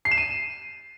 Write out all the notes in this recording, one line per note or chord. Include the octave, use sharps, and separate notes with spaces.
C7
E7
D#7